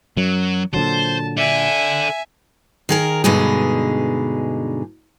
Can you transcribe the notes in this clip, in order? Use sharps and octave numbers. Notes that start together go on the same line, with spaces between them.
F#2 F#3
A#2 D3 F#3 C5 A5
A4 D5 E5 G#5
D#3 G#4 A#4
G2 B2 D3 G#3 D#4 G#4